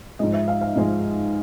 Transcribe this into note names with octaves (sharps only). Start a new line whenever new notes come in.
G#2 F3 G#3 D#5
E5
F5
F5
G#2 F3 G#3